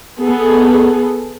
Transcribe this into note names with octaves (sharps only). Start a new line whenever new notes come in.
B3 G#4 A4